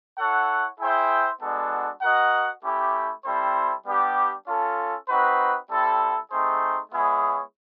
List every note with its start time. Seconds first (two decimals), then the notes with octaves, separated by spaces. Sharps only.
0.18 E4 A4 C#5 F#5
0.80 E4 G#4 C5 E5 G5
1.41 G#3 B3 D4 F#4 A4
2.02 F#4 A#4 D#5 F#5
2.64 A3 C#4 E4 G4
3.24 G3 C4 E4 A4 C5
3.86 G3 B3 D4 G4
4.46 C#4 F4 A4
5.08 C4 D#4 F#4 B4
5.69 G3 C4 E4 A4
6.31 A3 C4 D#4 G#4 C5
6.92 G#3 B3 E4 G#4 C#5